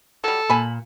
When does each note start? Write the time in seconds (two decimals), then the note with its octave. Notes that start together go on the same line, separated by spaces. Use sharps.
0.24 F#3 G3 A4
0.50 A#2 G#5 B5